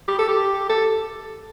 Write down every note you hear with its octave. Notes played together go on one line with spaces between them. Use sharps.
G4
A4
G4
A4